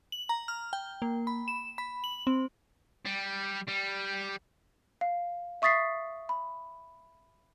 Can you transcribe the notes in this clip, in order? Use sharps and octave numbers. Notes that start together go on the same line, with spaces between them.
F#7
A#5
F6
G5
A#3
B5
E7
B5
F#7
C4
G3
G3
F5
E5 C#6 D#6 A6 B6 C7
B5